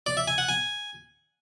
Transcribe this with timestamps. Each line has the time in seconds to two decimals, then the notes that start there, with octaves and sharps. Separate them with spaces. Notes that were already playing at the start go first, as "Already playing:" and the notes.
0.06 D5
0.17 E5
0.27 G#5
0.38 F#5
0.49 G#5